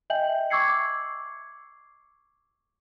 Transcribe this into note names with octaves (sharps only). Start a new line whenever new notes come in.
D#5 E5 G5 G#5 G6 F#7
C#6 D6 E6 G#6 C7 C#7